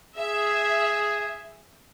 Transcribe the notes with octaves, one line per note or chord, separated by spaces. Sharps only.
G#4 E5